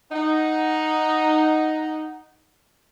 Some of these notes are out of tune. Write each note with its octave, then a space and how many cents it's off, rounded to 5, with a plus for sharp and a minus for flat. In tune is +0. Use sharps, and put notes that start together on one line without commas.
D#4 +0 F#5 +0